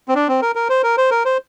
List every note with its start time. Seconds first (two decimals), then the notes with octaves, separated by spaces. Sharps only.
0.08 C4
0.15 D4
0.28 C4
0.42 A#4
0.56 A#4
0.69 C5
0.83 A#4
0.98 C5
1.11 A#4
1.25 C5